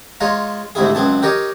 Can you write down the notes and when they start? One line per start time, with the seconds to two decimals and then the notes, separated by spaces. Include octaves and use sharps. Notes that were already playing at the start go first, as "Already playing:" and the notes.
0.20 G#3 F4 C#5 A#5
0.75 D2 G#2 C3 E4 G#4
0.95 C#2 F#2 C4 G#4 A5
1.22 G4 A#4 C#5 D#5